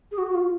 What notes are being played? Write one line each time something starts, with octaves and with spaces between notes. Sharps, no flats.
G#4
F#4
F#4
F4